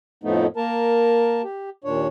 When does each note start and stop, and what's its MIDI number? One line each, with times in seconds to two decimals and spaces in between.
0.24 0.46 41
0.24 0.46 45
0.24 0.46 53
0.24 0.46 57
0.24 0.46 59
0.24 0.46 63
0.56 1.42 58
0.56 1.42 70
0.56 1.42 81
1.44 1.70 67
1.84 2.07 39
1.84 2.07 46
1.84 2.07 62
1.84 2.07 73